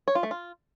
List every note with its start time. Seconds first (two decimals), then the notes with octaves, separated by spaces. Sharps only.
0.08 C#5
0.15 F4
0.23 A3
0.31 F4